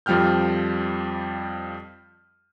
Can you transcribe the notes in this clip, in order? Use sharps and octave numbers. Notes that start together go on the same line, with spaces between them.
F2 F3 G3 G5 F6 G6